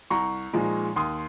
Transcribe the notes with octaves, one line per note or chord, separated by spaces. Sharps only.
C2 A#5 C#6
A#2 F3 G#3 D#4
D#2 C6 D#6